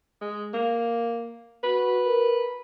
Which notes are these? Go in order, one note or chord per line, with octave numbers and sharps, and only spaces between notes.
G#3
A#3
F#4 B4
A#4